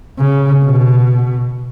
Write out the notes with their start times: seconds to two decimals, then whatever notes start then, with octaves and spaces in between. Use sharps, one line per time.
0.19 C#3
0.65 B2